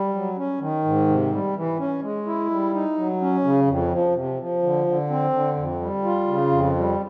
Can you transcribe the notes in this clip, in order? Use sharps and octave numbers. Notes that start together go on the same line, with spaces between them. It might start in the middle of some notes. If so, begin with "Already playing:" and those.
Already playing: G3
F#3
C#4
D#3
G#2
C3
G3
E3
C#4
G#3
E4
G3
D#4
F#3
C#4
C#3
F2
F3
C3
F3
D3
D3
C4
D3
F2
G3
F4
C#3
F2
G3